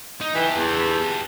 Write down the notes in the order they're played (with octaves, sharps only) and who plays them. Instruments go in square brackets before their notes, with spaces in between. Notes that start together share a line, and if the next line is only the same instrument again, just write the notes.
[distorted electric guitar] D#4
[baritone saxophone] E3 [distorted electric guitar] G4 A4
[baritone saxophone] E2